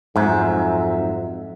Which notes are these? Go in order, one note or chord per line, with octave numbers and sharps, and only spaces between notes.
F2 G#2 F#3 C4 E5